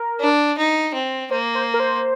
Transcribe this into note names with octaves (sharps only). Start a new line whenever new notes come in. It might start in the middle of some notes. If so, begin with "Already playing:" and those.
Already playing: A#4
D4
D#4
C4
A#3 C5
C5
A#4
C5